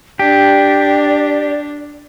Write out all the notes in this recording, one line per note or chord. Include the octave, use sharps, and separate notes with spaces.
D4 G4 D5